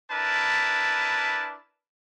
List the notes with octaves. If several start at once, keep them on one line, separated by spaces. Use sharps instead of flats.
D4 E4 A#4 B4 A5